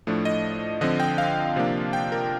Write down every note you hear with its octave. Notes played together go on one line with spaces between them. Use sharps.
A2 F3 A3 D4
D#5
D3 F3 C4 D#5
G5
F5
C3 F3 A#3 D4
G5
A#4